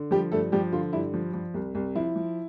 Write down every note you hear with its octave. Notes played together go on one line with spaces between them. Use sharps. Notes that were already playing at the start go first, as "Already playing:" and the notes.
Already playing: D3
F3 G3 G4
G2 A3 A4
F3 G3 G4
D3 F4
G2 E4
F3
F3
C2
C2
F3 E4
F3